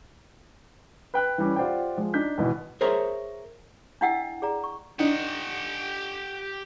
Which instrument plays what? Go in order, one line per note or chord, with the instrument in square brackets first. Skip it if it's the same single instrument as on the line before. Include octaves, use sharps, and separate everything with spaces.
[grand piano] B4 G5 F#6
E3 G3 C#4
F4 G4 C5 D5 F#5 G5
F3 G#3
D4 D#4 G6 B6
G#1 B2 E3
[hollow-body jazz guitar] G#4 A#4 C5 C#5 E5 A#5
[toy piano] D4 E4 D#5 F#5 G5 E6
G#4 D5 A#5
C#6
[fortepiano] D4 D#4 [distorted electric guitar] G4 F#5